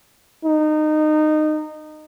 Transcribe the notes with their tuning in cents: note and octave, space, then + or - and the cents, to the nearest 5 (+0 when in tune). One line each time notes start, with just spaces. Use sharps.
D#4 -20